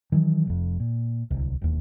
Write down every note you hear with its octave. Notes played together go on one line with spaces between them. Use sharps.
D#3 E3 F#3
F1 F2
A#2
D1 C2
E1 D#2